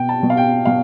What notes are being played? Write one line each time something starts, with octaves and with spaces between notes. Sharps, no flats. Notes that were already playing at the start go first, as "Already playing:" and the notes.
Already playing: B2 G5
A5
B2
F5
G5
B2 F5